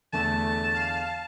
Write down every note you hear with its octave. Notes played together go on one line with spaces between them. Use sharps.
E2 D3 A3 A5
F5